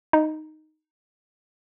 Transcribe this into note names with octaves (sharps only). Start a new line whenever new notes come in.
D#4